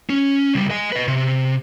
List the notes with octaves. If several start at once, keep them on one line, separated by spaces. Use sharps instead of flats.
C#4
C#2 G3
D#5 G#5
B4 D#5
C3